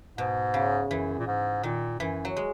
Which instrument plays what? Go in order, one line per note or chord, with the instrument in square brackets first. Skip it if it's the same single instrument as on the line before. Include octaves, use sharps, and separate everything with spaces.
[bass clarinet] G#2 [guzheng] B2
[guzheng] C#3
[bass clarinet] F#2 [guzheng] E3
[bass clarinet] A#2
G#2
[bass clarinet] A#2 [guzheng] D#3
[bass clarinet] F#2 [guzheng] E3
[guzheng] F#3
G#3